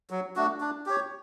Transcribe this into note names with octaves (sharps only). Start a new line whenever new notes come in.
F#3
A3 D4 F#4
D4
G4 C#5